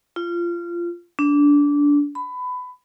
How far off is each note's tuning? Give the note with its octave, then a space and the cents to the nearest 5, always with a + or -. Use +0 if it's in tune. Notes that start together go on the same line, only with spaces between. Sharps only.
F4 -20
D4 -20
B5 +20